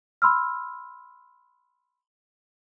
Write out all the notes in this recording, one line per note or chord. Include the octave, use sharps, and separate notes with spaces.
B5 C6 E6 F6